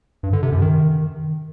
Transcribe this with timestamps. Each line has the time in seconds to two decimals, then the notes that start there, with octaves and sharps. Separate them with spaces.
0.23 G2
0.33 D3
0.43 C3
0.52 F#2
0.62 D#3